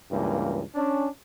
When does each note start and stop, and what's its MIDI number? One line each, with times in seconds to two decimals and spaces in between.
0.11 0.61 37
0.11 0.61 43
0.11 0.61 52
0.11 0.61 58
0.75 1.07 61
0.75 1.07 62